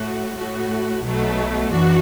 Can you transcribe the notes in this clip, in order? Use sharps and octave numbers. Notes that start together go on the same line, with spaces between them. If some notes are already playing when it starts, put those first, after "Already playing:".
Already playing: A2 A3 F#4
A2 A3 F#4
B1 B2 F#3 A3
F#2 E3 D4 F#4